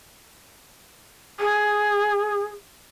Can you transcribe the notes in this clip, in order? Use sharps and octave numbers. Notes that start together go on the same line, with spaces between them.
G#4